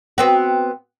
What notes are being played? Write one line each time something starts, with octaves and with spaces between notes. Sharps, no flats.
B3 C4 F#4